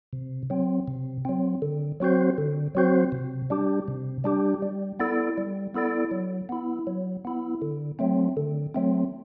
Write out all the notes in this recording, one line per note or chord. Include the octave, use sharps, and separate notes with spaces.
C3
F#3 C4
C3
F#3 C4
D3
F#3 C4 F#4 C5
D3
F#3 C4 F#4 C5
C3
G3 D4 G4
C3
G3 D4 G4
G3
B3 E4 A4 D5
G3
B3 E4 A4 D5
F#3
B3 E4
F#3
B3 E4
D3
F#3 A3 C4
D3
F#3 A3 C4